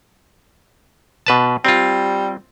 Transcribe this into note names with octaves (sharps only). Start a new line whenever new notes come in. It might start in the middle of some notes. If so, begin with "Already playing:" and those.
B2 B4 A5
G3 C4 F4